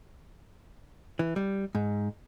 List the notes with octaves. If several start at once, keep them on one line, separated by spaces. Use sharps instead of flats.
E3
G3
G#2